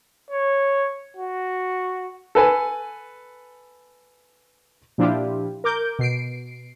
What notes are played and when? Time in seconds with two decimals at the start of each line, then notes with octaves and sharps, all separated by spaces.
0.31 C#5
1.17 F#4
2.35 A4 B4 G#5
4.98 A#2 F3 D4 E4 F4 G4
5.64 A#4 D6 G6
5.99 B2 C7 D7